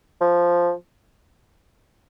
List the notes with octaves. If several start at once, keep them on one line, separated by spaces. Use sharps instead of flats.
F3